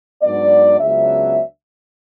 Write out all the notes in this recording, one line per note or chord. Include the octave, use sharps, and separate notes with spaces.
G#2 F#3 B3 D4 D5
C#2 C#3 F#3 B3 D4 E5